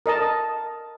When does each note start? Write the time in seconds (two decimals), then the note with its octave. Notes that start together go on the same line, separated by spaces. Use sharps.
0.06 A#4 D#5 A5